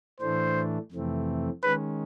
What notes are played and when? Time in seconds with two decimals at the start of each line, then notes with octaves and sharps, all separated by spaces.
0.21 A2 E3 A3 D4 C5
0.92 F2 C3 E3 A3 C4
1.63 D#3 G#3 C#4 B4